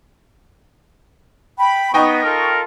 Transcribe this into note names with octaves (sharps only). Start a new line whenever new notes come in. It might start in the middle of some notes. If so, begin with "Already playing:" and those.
G5 B5
B3 D#4 D#5 G5 C#6
F4 A4 A#4